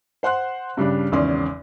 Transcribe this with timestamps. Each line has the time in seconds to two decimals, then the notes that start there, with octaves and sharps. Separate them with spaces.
0.23 C5 F#5 C6 F#6
0.77 G2 C#3 G3 D4
1.12 G#1 E2 C#3 C#4 D5 C6